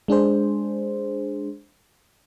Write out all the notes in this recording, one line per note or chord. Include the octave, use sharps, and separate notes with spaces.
G#3 D4 G#4 C5